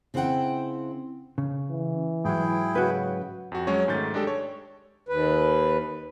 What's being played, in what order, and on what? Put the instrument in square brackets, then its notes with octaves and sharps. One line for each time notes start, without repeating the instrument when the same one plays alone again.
[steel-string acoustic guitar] C#3 C4 E4 A#4 F#5 G5
[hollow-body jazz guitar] C#3
[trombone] E3
[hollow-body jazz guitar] G#2 F#3 [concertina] E4 G#4 G5
[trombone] C#3 [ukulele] F#4 B4
[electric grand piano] F2 F#4
F#3 G#3 C#4 C#5
G#2 D#3 A3 G6 A6
G#3 D4 G4 A4
C#5
[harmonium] D#2 B4